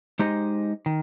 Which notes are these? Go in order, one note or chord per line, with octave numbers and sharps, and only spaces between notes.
G#3 D#4 G4 C5 D#5
D#3